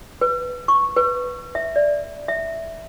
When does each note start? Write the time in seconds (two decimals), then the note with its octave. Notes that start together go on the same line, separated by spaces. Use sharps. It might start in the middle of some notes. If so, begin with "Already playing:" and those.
0.21 B4
0.68 C#6
0.96 B4
1.55 E5
1.76 D5
2.28 E5